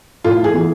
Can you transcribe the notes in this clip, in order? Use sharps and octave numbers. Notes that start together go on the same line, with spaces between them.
A2 F4
G#4
E3 B3